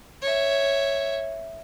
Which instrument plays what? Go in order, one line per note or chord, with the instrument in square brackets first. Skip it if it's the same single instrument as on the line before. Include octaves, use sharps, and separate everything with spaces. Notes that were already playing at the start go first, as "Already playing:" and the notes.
[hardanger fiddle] C#5 E5